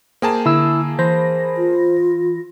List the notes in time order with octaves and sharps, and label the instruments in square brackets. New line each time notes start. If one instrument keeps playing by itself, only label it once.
[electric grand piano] A#3 G#4 A5 [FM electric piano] C5 G5 A#5
[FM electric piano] D3 [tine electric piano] E4 E6
[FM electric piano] E3 B5 A#6 [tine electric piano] C5
[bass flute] F4